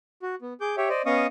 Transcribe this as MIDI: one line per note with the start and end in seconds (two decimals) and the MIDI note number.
0.23 0.35 66
0.42 0.54 59
0.61 0.76 68
0.61 0.76 86
0.61 0.76 91
0.77 0.89 67
0.77 0.89 73
0.77 0.89 76
0.77 0.89 79
0.89 1.02 72
0.89 1.02 74
0.89 1.02 75
1.06 1.27 59
1.06 1.27 61
1.06 1.27 75
1.06 1.27 77
1.06 1.27 85
1.06 1.27 87